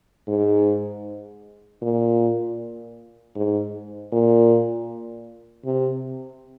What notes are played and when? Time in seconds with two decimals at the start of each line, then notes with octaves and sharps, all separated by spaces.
0.28 G#2
1.82 A#2
3.36 G#2
4.12 A#2
5.65 C3